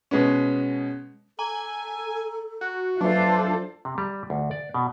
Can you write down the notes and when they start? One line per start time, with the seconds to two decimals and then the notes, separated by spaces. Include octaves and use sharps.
0.11 B2 G#3 B3 C#4
1.39 A4 G#5 A#5
2.61 F#4
3.01 F#3 D4 F4 A4 B4 C5 E5
3.85 C3
3.98 G3
4.30 D2
4.51 D5
4.74 B2